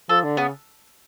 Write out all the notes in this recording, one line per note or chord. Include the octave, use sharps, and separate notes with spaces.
F3 A4
D3
C#3 B3